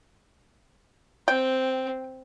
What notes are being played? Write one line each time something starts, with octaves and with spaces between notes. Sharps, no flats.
C4 G5